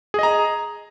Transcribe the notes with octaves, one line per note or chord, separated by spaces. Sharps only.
G#4 D#5 A#5